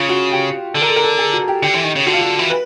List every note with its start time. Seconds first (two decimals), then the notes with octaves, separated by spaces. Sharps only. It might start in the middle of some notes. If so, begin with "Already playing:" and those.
Already playing: C#3 F4
0.09 F#4
0.31 G4
0.74 D3 A4
0.82 A#4
0.88 A4
0.96 A#4
1.03 A4
1.18 G#4
1.33 F#4
1.48 G4
1.63 D3 G4
1.74 E3
1.84 D#3
1.95 C#3
2.06 D3 F#4
2.13 F4
2.21 F#4
2.39 E3
2.50 B4